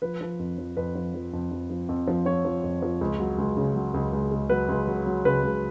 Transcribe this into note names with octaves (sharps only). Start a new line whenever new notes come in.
F3 B4
F3
F2
F3
F2 B4
F3
F3
F2
F3
F3
F2
F3
F3 C#5
F3
F2
F3
C#2
F#3
C#2
C#3
F#3
C#2
C#2
C#2
F#3 B4
C#2
F#3
F#3
C#3 B4
C#2